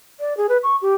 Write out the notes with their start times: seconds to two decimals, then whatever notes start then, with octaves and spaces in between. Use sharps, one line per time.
0.20 D5
0.37 G#4
0.49 B4
0.63 C#6
0.82 G4